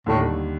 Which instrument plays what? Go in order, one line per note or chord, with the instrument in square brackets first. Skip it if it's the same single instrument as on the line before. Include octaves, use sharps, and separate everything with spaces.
[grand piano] D#2 D3 G3 [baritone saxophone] A2